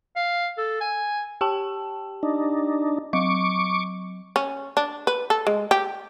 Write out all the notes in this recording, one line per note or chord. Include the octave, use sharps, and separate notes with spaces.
F5
A4
G#5
G4 G5 A5
D4 D#4
F#3 C#6 D6
C#4
D4
B4
A4
G#3
G4